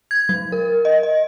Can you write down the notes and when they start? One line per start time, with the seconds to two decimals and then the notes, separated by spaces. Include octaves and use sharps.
0.11 G#6
0.29 F#3
0.52 A#4
0.85 D#5
1.03 D#5